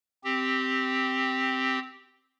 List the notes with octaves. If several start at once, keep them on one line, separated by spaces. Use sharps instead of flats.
C4 G4